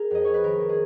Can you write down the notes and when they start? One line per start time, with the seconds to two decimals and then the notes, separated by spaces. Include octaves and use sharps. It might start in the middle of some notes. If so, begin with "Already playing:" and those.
Already playing: G#4 A#4
0.11 F2 D#5
0.25 D#4 C#5
0.34 B4
0.44 D#3 A#4
0.61 D#3
0.69 G#4